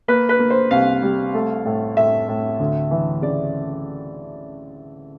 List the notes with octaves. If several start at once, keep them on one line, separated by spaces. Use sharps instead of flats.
A#3 B4
B4
A#3
C5
C2 F5
G3
A3
A2
A2 E5
A2
D2
E3
C#3 D5